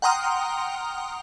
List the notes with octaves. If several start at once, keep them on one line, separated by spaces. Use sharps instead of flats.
F#5 G5 A#5 C6 D#6 F6